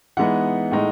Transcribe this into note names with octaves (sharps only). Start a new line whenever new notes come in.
E3 G#3 B3 D#4 F#5
A2 G#3 D#4